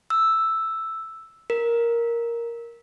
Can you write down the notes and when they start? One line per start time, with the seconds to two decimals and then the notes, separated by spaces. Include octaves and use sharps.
0.10 E6
1.50 A#4